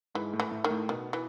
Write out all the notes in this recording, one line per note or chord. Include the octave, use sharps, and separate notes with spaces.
G#2 E3 G#3
A2 A3
E3
A2 A3
D#3
A2 A3
B2 D#3 B3
E3